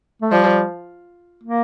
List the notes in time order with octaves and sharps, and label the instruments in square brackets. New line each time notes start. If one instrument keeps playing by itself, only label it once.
[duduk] A3
[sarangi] F3 [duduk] G3
[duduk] A#3